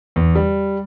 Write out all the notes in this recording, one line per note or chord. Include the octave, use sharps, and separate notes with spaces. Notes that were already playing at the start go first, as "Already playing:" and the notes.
E2
G3